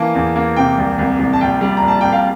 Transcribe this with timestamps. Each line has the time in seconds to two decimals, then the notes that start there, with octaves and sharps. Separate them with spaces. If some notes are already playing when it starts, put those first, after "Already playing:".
Already playing: E3 A#3 A5
0.15 E2
0.36 A#3
0.56 C3 G5
0.78 C2
0.99 C2
1.19 C2
1.33 A5
1.41 A#1 G5
1.61 G3
1.77 A#5
1.83 A#1
1.88 A5
2.01 A#1 G5
2.12 F5